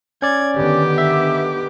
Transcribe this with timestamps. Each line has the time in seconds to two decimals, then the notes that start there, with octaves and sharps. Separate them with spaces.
0.22 C#4 D5 G#6
0.56 D3 D#3 B3 G4 D6
0.98 E5